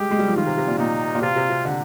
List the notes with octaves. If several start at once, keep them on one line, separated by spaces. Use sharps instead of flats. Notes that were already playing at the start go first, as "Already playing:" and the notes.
Already playing: G3 G#3 G4
G#3
G3
F3
D#3 F4
C3
C3
A#2
A#2 D#4
A#2
C3 F4
C3
C3
D3